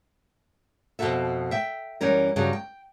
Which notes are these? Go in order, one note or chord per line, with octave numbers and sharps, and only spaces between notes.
F2 B2 G#3 F#4 A4 E5
E5 G5
F#2 E3 G3 C#4 A#4
G2 C#3 F#3 G3
G5